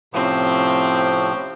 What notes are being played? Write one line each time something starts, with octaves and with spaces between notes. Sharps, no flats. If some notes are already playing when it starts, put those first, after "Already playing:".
A2 C3 F3 C4 C#4